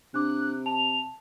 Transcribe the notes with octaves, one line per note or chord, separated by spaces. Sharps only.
C3 D4 D6 F#6
A5 F7